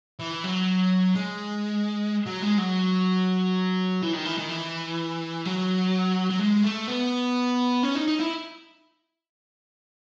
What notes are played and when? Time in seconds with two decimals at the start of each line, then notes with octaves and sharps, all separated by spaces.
0.20 E3
0.44 F#3
1.16 G#3
2.27 F#3
2.43 G#3
2.58 F#3
4.02 E3
4.13 D#3
4.25 E3
4.38 D#3
4.49 E3
5.45 F#3
6.30 F#3
6.40 G#3
6.64 A3
6.88 B3
7.83 C#4
7.95 D#4
8.07 D#4
8.20 E4